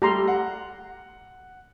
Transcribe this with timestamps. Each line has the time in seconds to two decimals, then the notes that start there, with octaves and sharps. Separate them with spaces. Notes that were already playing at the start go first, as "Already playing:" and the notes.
0.02 G3 A3 G4 A#5 C6
0.28 F#5